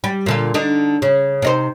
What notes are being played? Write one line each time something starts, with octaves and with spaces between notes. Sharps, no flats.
G3
A#2 D3 F4
D3 D4 D#4
C#3
C3 D#4 C5